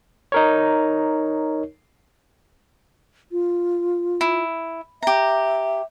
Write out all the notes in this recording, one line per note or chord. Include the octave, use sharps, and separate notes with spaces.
D#4 A#4 C#5
F4
E4
G4 E5 A#5